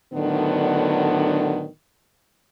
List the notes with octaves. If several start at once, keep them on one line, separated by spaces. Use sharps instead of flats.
A2 D3 D#3 F#3 B3 D4